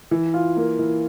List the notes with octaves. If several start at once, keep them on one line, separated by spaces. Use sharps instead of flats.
E3
F4
A#3
E3